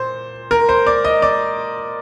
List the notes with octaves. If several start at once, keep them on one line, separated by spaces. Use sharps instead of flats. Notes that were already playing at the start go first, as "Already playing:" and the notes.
Already playing: A#2 C5
A#4
C5
D5
D#5
D5